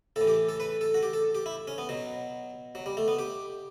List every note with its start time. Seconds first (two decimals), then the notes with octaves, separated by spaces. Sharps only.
0.16 A2 E3 A4
0.27 G4
0.49 A4
0.60 B4
0.81 A4
0.94 F#4
1.03 G4
1.13 A4
1.35 G4
1.46 E4
1.68 C#4
1.78 B3
1.89 B2 F#3
2.75 F#3
2.86 G3
2.97 A3
3.08 B3
3.19 G4